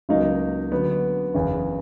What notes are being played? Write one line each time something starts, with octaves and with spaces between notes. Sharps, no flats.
C#2 C#3 F#3 A#3 D#4
D3 F#3 B3
F#1 E2 C#3